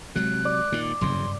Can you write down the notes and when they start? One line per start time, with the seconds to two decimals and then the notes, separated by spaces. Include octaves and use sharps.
0.15 C3 F#3 G#3 F#6
0.45 D5
0.72 A#2 D#3
1.01 F#1 E2 G2 C#3 C6